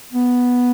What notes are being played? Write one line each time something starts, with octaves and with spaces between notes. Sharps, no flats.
B3